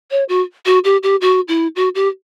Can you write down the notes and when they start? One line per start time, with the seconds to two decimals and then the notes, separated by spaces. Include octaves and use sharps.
0.11 C#5
0.29 F#4
0.66 F#4
0.84 G4
1.03 G4
1.21 F#4
1.48 E4
1.76 F#4
1.95 G4